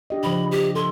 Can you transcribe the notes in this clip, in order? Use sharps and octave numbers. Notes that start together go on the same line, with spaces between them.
D4 G4 D#5
C#3 F3 B5
G4
A4 C6